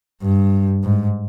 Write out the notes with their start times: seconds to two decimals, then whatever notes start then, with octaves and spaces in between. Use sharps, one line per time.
0.22 G2
0.84 G#2